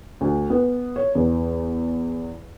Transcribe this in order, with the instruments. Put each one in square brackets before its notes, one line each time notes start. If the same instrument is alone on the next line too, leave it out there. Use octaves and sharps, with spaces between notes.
[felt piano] D2
B3
C#5
E2